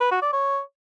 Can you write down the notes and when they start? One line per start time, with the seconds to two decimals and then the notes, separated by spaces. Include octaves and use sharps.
0.01 B4
0.11 F#4
0.22 D5
0.33 C#5